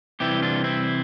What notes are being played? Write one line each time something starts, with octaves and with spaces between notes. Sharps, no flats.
C3 E3 G3 E4 G4
D4 F4
C4 E4